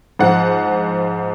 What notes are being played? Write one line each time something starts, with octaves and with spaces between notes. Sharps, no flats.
G#2 F3 F#5